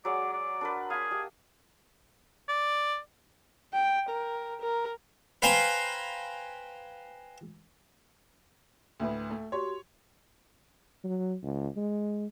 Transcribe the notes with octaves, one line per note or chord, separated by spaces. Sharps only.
F#3 G#3 D5 F#5
D5
D4 A#4 B4
G#4 F5 C6
G4 D#5
D5
G5
A#4
A#4
B4 C5 F5 G5 G#5 A#5
D2 A2 B4
A3
F#4 G4 C#5 C6
F#3
C#2
G#3